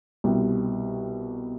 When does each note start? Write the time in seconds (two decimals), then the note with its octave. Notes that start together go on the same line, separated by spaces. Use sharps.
0.24 C2 B2 G3